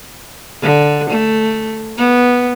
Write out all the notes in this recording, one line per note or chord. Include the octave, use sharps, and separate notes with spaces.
D3
A3
B3